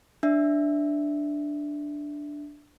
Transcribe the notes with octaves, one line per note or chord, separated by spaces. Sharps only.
D4 E5